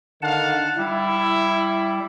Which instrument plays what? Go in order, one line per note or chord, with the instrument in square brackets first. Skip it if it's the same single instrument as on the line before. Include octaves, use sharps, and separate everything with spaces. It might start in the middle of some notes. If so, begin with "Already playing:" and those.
[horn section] D3 D#3 F5 [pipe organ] F#5 A5
[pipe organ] G3 [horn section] E4